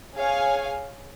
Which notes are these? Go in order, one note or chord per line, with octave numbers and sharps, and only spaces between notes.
G#4 C#5 F5 G#5